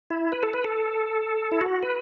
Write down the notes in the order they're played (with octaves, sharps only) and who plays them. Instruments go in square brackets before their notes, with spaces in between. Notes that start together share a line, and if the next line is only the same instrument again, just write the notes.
[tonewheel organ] E4
B4
A4
B4
A4
E4
F#4
B4